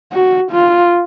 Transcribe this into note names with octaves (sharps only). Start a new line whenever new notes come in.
F#4
F4